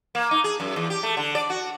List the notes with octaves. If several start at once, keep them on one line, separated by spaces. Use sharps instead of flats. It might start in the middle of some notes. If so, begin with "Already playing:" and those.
A#3
D#4
G#4
F#2
E2
G4
A3
D3
D5
F#4